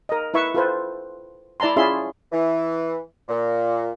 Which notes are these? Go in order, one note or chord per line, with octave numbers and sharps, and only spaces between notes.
A#4 D#5
E4 B4 E5 C#6
F4 A4 B4 C5
E4 D5 A5 A#5 C6
C#4 E4 F4 G#4 E5 C6
E3
A#2